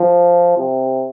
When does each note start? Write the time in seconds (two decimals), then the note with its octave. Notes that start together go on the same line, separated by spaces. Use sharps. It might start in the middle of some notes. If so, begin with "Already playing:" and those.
Already playing: F3
0.58 C3